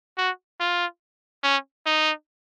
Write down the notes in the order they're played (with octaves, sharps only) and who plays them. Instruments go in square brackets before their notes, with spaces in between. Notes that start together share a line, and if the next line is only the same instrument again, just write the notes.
[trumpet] F#4
F4
C#4
D#4